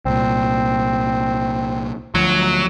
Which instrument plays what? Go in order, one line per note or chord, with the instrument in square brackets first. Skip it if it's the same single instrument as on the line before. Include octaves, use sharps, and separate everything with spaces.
[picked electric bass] C2 A#2 [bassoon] C4
[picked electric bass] D2 F3 [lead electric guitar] F#3